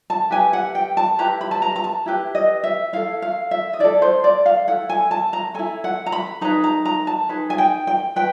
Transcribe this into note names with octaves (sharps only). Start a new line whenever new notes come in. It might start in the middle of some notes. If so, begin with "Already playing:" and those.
A5
E4 G4 B4 G#5
F#5
G5
A5
E4 G4 B4 A#5
B5
A5
A#5
A#5
A5
E4 G4 B4
D#5
E5
E4 A4 F5
F5
E5
D#5
E4 A4 D5
C5
D5
F5
E4 A4 F#5
G#5
A5
A#5
E4 A4 G#5
F#5
A#5
B5
D#4 G#4 B4 A#5
A#5
A#5
A5
D#4 G#4 B4
G#5
G5
G5
B4 G5